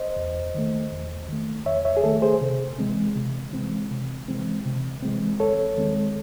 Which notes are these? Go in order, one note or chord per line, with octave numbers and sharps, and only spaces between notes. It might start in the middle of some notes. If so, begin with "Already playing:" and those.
Already playing: C5 D#5
E2
D#3 A3
E2
D#3 A3
E2 C#5 E5
C#5 E5
G#4
D#3 A3 A4
G#4 C5
C3
E3 G#3 C4
C3
E3 G#3 C4
C3
E3 G#3 C4
C3
E3 G#3 C4
D#2 A4 C#5
D#3 G#3 C4